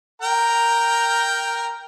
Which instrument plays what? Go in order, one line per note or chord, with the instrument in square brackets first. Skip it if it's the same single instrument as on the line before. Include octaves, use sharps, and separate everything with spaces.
[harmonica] A#4 G5 A#5